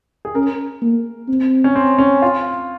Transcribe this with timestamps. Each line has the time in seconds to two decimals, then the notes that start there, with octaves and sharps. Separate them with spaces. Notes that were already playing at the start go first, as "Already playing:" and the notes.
0.25 G#4
0.35 C#4 A#4
0.82 A#3
1.28 C4
1.64 C#4
1.75 C4
1.98 C#4
2.22 F4